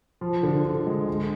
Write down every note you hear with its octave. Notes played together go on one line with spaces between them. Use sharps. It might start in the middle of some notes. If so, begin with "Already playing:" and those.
F3
D3
D3
G#3
G#3